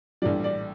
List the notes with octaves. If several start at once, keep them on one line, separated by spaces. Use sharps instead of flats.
A#1 A2 E3 G3 D5
D5